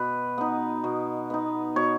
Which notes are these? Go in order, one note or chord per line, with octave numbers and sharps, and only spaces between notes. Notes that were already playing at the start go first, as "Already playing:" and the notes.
Already playing: B2 B4
B3 D#4
B2
B3 D#4
B2 C#5